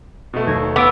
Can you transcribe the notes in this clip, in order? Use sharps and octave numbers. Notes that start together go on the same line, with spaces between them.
B2 A3
D#2 G#6 A#6
B3 D6 E6 D7